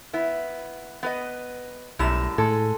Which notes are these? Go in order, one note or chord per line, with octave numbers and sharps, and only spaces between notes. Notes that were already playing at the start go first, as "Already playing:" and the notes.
B3 E4
B3 B4 D#5
B1 F#2 A2 G3 A#5 E7
A2 G#3 A4